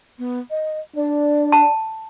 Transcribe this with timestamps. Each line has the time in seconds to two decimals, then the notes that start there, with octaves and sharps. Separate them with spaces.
0.19 B3
0.51 D#5
0.96 D4 D5
1.52 A5